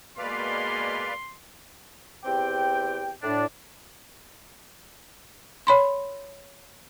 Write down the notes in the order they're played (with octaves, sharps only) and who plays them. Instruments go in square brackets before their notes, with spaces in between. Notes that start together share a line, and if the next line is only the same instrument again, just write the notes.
[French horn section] B2 G#3 A#3 [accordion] B4 D5 F5 [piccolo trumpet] C6
[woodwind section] E2 C4 G4 G5
A2 D4
[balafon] C#5 B5 C6